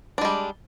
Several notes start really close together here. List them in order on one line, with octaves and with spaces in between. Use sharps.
D4 G#3 G3